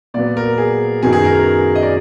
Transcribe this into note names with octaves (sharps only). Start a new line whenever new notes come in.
A#2 F#3 B3 D5
A#4
G#4
F#2 D#3 F#3 B3 G#4
G#4
A#4
A#4
D#5
D5